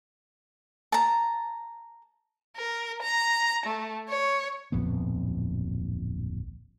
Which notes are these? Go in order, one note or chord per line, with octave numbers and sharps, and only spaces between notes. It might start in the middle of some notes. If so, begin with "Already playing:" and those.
A5 A#5
A#4
A#5
A3
C#5
D1 A#1 F2 B3